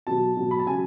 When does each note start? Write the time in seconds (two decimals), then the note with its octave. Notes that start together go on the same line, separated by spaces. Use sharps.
0.07 B2 F#3 A5
0.37 B2 F#3
0.51 B5
0.59 A5
0.67 C#3 F#3 G#5